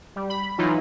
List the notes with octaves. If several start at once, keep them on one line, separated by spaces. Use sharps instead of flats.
G3
B5
E3 F#3 D#4 F4